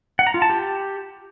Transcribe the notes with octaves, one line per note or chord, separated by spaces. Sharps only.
F#5
A#5
F4
A5
G4